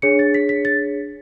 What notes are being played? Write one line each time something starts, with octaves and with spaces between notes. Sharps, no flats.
D4 G#4 C#5 C#7
A6
B6
B6
A6